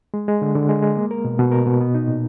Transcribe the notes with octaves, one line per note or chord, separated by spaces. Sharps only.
G#3
G#3
D3
D3
G#3
G#3
A#3
A#4
B2
B2
A#4
B2
B3
D#4
A#2